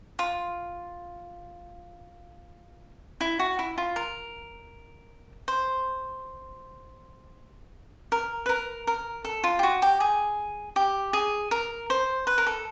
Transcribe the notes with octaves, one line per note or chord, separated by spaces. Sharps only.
F4
E4
F#4
E4
F4
A#4
C5
A#4
B4
A#4
A#4
A4
F4
G4
F#4
G4
G#4
G4
G#4
A#4
C5
B4
A#4
A4